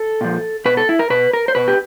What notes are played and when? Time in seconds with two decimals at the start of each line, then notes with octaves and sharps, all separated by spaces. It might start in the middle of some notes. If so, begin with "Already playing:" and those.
Already playing: A4
0.21 A#2 F3
0.65 B2 B4
0.77 A4
0.89 E4
0.99 A#4
1.10 B2 B4
1.33 A#4
1.48 C5
1.55 B2 B4
1.68 G4